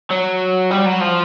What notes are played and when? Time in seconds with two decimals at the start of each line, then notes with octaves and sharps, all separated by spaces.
0.11 F#3
0.71 G3
0.86 F#3
1.01 F3